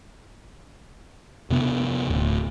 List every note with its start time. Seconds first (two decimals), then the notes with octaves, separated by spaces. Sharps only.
1.50 F2 C3 B3
2.08 D1 D2